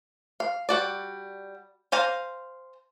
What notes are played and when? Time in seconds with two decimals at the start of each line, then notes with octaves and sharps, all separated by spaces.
0.40 F5
0.69 G3 F#4 D5
1.92 C5 F5 G#5 A#5